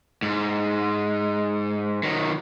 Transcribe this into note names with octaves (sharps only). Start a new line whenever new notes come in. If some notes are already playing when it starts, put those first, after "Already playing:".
G#2
D#3 F#3